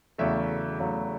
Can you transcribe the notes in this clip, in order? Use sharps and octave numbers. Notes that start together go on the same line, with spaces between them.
E2 C#3 F#3 A3 E5
E2 C#3 F#3 A3